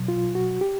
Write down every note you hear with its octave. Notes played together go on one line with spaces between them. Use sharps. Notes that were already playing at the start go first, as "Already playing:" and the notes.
Already playing: B2 F#3
F4
F#4
G4